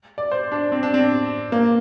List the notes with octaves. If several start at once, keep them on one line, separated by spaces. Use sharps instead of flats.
D5
C5
D4
C4
D4
C4
A#3